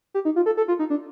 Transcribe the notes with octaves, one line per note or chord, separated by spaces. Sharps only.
G4
D#4
F4
A4
A4
F4
D#4
D4